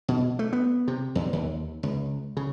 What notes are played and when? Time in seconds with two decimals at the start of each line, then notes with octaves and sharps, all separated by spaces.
0.08 B2
0.39 A3
0.53 B3
0.88 C3
1.15 E2
1.33 D#2
1.83 C#2
2.37 C#3